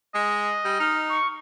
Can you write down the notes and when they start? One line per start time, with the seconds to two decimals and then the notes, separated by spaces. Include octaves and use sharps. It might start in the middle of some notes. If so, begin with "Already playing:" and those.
0.15 G#3 D#5
0.65 G3
0.80 D#4 F6
1.09 C#6